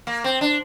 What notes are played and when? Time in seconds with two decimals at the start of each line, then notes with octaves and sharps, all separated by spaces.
0.07 A#3
0.24 C4
0.41 D4